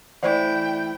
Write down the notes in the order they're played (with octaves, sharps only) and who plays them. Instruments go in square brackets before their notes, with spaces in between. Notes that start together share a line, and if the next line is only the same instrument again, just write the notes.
[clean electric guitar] E3 A3 E4 [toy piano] C5 D5 [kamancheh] G5